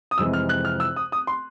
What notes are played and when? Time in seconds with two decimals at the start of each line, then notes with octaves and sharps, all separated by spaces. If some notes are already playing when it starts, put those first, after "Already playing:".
0.11 D#6
0.18 F1 F2 C3 E3 G#3 E6
0.33 F6
0.49 F#6
0.65 F6
0.80 E6
0.96 D#6
1.12 D#6
1.27 C6